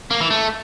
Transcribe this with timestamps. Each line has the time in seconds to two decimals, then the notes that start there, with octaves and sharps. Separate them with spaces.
0.11 A#3
0.21 E3
0.30 A3